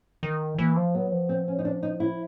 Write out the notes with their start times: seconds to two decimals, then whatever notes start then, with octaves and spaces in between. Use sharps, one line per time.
0.23 D#3
0.58 E3 A#3
0.76 F3
0.95 F#3 B3
1.12 F3
1.29 C4
1.48 C#4
1.59 D#4
1.65 D4
1.83 D#4
2.00 E4